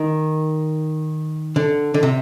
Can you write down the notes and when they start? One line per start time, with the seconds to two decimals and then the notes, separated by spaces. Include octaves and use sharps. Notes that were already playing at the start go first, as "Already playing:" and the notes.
Already playing: D#3
1.56 D3
1.94 D3
2.03 C3